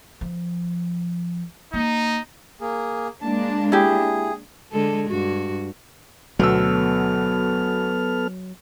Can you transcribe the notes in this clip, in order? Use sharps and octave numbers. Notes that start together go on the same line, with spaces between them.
F3
A#3 D#4
A#3 G#4
G#3 A#3 D4 A5
E4 G4 G#4
D3 G#3 A4
G2 F#4
D2 B2 F#3 B3 A4 E6 F6